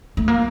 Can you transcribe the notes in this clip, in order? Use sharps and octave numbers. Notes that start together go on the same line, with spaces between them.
A3
A#3